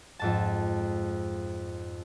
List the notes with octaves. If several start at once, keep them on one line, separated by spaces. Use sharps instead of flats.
F2 G#2 A5